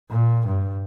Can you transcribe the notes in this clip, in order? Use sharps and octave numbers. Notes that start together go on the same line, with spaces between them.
A#2
G2